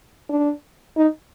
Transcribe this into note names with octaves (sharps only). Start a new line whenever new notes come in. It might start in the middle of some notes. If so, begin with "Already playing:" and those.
D4
D#4